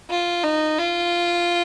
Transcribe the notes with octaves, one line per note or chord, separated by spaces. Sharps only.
F4
D#4
F4